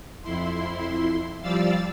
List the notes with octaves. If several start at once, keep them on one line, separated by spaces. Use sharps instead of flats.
F2 E4 C6
F3 G3 D5 F5 E6 A6